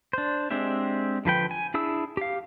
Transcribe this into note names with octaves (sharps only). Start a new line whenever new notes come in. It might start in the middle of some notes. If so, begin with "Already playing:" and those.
D4 C5
G#3 C4 D4 G4 E5
D3 F3 B4 G5
G#5
D4 E4 G#4 E6
G4 F5